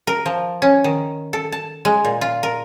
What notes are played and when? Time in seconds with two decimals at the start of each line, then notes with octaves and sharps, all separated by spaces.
0.07 A#4
0.26 F3
0.62 C#4
0.84 D#3
1.33 A4
1.52 A5
1.85 G#3
2.05 A#2
2.21 F4
2.43 A#4